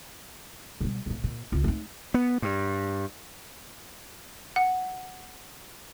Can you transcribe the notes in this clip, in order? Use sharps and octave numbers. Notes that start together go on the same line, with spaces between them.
B2 G3
B1 A2
A#2
C#2 F4
A3 D#4
B3
G2
F#5